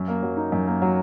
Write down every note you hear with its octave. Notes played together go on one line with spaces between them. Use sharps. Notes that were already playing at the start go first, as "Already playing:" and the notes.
Already playing: F#2
A#3
F#3
D#4
F#2
A#3
F#3